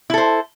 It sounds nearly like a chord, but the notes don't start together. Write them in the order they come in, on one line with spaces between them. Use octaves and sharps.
E4 A4 C5